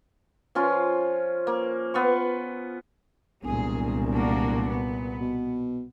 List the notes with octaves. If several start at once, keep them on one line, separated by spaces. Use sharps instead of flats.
F3 C#4 F4 C6
A#3
B3 F4 C#6
E1 C2 A#2 G#4
A#3 D4 F#4
B3
B2